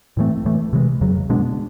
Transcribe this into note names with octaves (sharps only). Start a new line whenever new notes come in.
A2 E3 A3 C4
A2 E3 A3
C3 E3 G#3
F2 C#3 F#3
B2 G#3 B3 D4